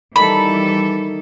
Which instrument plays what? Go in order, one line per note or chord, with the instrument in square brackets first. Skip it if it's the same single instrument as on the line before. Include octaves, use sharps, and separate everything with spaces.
[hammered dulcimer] D#3 A5 [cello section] E3 G3 A4 [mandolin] B5